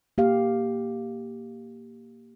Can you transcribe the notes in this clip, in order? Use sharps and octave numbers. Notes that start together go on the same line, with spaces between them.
A#3 G4 F5